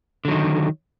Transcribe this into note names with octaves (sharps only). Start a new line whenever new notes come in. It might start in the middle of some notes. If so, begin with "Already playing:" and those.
D3 D#3 F#3